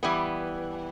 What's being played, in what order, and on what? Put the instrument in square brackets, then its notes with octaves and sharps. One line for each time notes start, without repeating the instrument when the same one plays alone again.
[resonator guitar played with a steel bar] E3 G3 B3